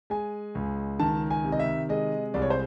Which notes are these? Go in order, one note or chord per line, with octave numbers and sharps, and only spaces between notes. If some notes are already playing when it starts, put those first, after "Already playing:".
G#3 G#5
C#2
D#3 A5
G#5
C3
D#5
E5
G#3 D#5
C2 D5
C#5
C5